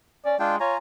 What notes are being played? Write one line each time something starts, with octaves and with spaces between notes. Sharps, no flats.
C#4 D5
G#3 D4 F4 G5
F4 C#5 G#5 A#5